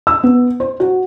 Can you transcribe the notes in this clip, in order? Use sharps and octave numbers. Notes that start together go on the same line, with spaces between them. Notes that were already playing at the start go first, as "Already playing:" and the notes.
E6
B3
C5
F#4